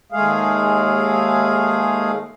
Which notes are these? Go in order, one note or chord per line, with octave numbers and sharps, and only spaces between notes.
D#2 G#3 A3 G#4 F5